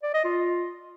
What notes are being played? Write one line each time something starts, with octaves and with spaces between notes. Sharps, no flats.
D5
D#5
F4